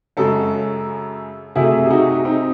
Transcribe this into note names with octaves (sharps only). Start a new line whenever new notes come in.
F#2 C#3 G#3 F#4 A4
C3 F#3 A3 E4 G#4
G#4
D#4 F#4
C4 D#4